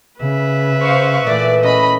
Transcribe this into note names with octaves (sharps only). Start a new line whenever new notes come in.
C#3 B4 E5
C5 F5 C#6
A#2 E3 A3 D5
C#4 D#5 B5